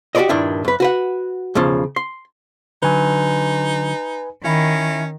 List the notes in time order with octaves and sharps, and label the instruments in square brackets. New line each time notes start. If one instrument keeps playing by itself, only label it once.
[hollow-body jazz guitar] F#4 G4 A4 C5 D5 D#5
G2 A#2 D#3 D4 E4
F#2 B4
F#4 B4 F#5
B1 E2 C#3 F3
C6
[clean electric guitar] D3 F#3 [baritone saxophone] D#4 [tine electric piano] B4 G#5
[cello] D#3 [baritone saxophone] C#4 [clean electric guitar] E4